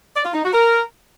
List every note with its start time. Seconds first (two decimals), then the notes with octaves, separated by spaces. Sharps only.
0.15 D5
0.24 F4
0.34 D#4
0.43 F#4
0.53 A#4